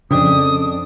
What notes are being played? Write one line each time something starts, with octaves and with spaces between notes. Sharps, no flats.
F2 C#3 D4 D5 D#6